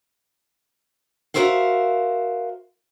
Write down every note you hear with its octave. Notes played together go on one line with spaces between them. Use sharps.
F#4 G4 A#4 C5 E5 F5